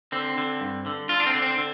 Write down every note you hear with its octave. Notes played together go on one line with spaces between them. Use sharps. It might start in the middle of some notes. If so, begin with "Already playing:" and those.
D3 C4
D3
G2
D3
D3 F4
D4
C4
D3
C4
D3